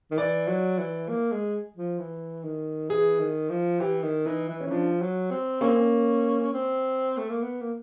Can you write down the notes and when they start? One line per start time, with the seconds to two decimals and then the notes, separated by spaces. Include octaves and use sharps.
0.11 D#3
0.18 E3 D5
0.48 F#3
0.79 E3
1.09 A#3
1.32 G#3
1.76 F3
1.99 E3
2.44 D#3
2.89 E3 G#4
3.19 D#3
3.50 F3
3.80 E3 G4
4.03 D#3
4.26 E3 D#4
4.49 E3
4.60 C#4
4.67 E3
4.71 F3 D4
5.01 F#3
5.31 C4
5.61 A#3 C#4
5.69 C4
5.77 C#4
6.41 C#4
6.53 C4
7.17 A3
7.30 A#3
7.42 B3
7.61 A#3